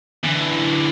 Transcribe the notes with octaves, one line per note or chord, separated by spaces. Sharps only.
D3 E3